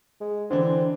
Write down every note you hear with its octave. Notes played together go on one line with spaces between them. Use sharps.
G#3
D3 E3 C4 D4